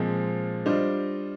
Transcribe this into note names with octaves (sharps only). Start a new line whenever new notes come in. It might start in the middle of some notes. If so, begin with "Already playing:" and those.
Already playing: A#2 F3 G#3 C4
G3 D4 F4 C5 D#5